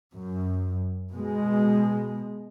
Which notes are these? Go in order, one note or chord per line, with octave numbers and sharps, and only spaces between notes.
F#2
B2 G#3